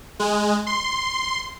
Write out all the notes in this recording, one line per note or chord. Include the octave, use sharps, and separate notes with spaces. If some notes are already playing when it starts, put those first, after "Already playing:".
G#3
C6